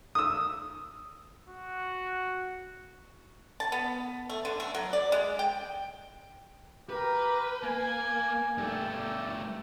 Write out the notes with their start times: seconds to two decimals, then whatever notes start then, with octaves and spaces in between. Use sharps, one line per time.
0.15 D#6 E6
1.48 F#4
3.60 A5
3.72 B3
4.30 A3
4.45 D3
4.60 A3
4.75 F#3
4.93 D5
5.12 G#3
5.39 G5
6.90 G4 A#4 B4
7.63 A#3 G#5
8.58 G2 A3 D5 G5